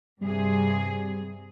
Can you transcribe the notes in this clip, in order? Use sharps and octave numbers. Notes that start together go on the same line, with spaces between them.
G2 C3 G3 G#4